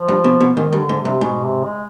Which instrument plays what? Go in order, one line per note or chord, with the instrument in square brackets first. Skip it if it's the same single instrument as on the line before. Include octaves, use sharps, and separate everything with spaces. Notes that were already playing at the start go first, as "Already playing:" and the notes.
Already playing: [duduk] F3
[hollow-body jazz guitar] G2
B2
B2
[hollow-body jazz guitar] G#2 [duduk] D#3
[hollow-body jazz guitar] G2 [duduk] D#3
[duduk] D3
[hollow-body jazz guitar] G#2
[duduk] C3
[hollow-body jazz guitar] G2
[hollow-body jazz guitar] G#2 [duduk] B2
[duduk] C3
G#3